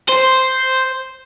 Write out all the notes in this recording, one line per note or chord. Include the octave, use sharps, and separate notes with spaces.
C5